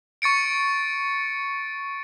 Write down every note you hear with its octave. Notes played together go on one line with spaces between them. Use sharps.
C#6 A6 C#7 D7